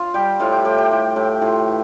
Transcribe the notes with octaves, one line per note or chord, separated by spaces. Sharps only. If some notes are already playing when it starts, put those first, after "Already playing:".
Already playing: F4 F5
G3 G4 G5
A2 F4 F5
G4 G5
A2 G4 G5
G4 G5
A2
A2 G4 G5
A2 F4 F5
E3